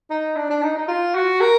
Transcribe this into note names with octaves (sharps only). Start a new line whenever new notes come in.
D#4
D4
D4
D#4
D#4
F4
F#4
A#4